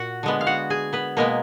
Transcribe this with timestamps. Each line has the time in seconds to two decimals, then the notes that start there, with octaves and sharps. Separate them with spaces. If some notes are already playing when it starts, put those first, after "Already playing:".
Already playing: A#2 F#4 F#5
0.23 D3 G#3 B3
0.41 F5
0.47 F#4 F#5
0.70 G#4 G#5
0.93 B3 B4
1.17 B2 G#3 A#3 B3 A#4